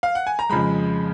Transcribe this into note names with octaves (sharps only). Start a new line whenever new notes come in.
F5
F#5
G#5
A#5
F2 C#3 F3 G#3 B5